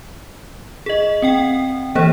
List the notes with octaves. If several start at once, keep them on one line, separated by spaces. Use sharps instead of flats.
G#4 D#5
C4 F#5 G5
E3 A#3 G4 C5 C#5